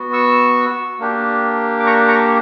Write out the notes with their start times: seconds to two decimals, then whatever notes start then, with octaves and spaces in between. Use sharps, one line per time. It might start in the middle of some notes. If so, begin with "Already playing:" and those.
Already playing: B3 F#4
0.13 C#6 E6
1.00 A#3 D4 G4
1.80 D6
1.87 A#5 C#6
2.08 A#5 C#6